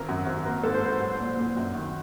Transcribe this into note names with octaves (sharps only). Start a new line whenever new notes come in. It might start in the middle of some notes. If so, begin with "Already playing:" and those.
Already playing: G#1 A#4
F#2
G#1
A#3 A#4
G#2 A4
C5
G#2 B4
F#3 C5
A#2
A#2
F#2
D#3